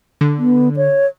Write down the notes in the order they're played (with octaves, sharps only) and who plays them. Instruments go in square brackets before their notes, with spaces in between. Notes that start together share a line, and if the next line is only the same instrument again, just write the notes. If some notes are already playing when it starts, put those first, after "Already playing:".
[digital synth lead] D3
[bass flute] B3
C#5